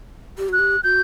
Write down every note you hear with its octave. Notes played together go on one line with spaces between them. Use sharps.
G4
F#4 F#6
G4
F#4 G6